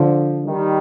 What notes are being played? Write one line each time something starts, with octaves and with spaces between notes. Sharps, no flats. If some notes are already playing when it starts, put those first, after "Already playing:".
Already playing: D3 F3
D#3 G3